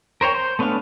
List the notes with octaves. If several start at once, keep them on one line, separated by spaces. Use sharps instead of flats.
A#4 C5 C#5 G5
C5
A3 B3 C#4 D4 F5